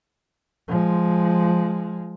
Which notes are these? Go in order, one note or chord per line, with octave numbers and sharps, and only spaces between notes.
F3 G#3